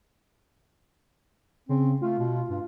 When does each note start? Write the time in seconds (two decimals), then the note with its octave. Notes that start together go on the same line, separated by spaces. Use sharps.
1.69 C#3 C4
2.02 A3 F4
2.19 B2
2.50 G2